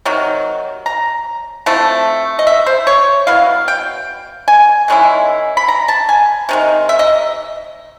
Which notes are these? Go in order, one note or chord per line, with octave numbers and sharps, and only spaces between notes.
C3 D#3 F#3
A#5
F3 A3 C4 E4
D#5
E5
C5
C#5
F#3 B3 E4 F5
G5
G#5
D#3 G#3 C#4 E4
B5
A#5
A5
G#5
C3 D#3 G#3
E5
D#5